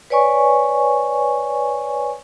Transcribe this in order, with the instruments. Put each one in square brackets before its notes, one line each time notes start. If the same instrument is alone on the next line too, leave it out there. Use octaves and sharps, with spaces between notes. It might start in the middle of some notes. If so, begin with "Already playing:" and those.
[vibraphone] B4 C#5 D5 G#5 C#6